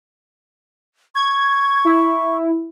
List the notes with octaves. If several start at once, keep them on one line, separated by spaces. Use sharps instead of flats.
C#6 G#6
E4